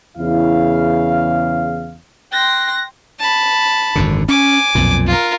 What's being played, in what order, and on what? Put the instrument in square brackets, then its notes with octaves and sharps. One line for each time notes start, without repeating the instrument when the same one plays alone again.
[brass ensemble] E2 C#3 E4 F5
[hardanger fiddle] G5 C6 [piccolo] F#6 [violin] A#6
[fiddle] A5 B5
[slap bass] G#1 F#2 D3
[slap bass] C#4 [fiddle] G#5 D6
[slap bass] B1 F2 A#2
[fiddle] F4 A#4